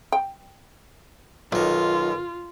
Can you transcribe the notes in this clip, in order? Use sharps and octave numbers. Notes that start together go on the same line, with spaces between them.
G5
B1 D#3 F4 D5